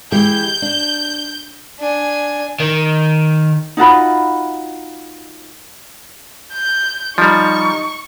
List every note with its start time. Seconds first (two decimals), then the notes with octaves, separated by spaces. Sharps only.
0.12 E3 G#3 G4 G6
0.62 D4
1.79 D4 G#5
2.60 D#3
3.77 D#4 F4 F#4 B5
6.53 G6
7.18 F3 G3 D#4 C#6